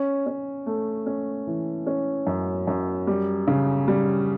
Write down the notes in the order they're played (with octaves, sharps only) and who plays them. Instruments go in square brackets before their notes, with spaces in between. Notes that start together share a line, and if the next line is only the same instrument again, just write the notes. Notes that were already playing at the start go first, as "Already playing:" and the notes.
Already playing: [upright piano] C#4
C#4
A3
C#4
E3
C#4
F#2
F#2
G3
C#3
G3